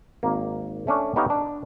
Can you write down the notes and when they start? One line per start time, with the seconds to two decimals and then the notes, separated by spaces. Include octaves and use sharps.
0.23 G#1 A#3
0.87 A3 C#4 D4
1.16 B3 D#4 G4 C#5 F5
1.30 D4